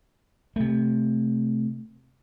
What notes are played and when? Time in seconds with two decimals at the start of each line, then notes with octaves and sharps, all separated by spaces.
0.56 C3 A3